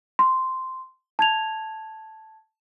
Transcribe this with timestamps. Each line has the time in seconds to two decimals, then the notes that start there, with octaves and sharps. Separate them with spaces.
0.19 C6
1.19 A5 G#6 F7